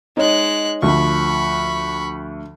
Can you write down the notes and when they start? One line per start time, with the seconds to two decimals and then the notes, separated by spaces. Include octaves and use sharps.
0.17 G#3 D#4 C#5 F#6
0.82 D2 F3 B5 C#6